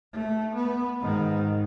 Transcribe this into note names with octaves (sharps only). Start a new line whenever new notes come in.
A3
B3
G#2 D#3